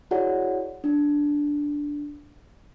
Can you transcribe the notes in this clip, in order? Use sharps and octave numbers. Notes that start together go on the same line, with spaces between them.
E4 F#4 G#4 C#5 D5 F#5
D4